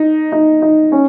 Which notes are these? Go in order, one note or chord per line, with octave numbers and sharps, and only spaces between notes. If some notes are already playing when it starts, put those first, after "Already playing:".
Already playing: D#4
D#4
D#4
C#4